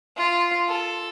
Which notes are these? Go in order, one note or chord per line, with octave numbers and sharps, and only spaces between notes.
F4
A4